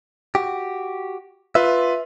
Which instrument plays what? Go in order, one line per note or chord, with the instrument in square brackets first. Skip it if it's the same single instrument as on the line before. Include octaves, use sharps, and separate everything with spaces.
[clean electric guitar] F#4 G4
[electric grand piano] F4 B4 [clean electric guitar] E5